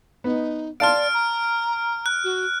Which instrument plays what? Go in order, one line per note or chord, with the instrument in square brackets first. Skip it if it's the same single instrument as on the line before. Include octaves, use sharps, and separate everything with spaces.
[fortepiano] B3 [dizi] D#4
[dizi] D5 [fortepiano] F5 A5 C6 [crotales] F6 D7
[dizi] A#5
[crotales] F#6
[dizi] F#4